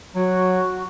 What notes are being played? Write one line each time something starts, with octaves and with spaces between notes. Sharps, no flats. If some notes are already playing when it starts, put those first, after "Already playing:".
F#3 F#4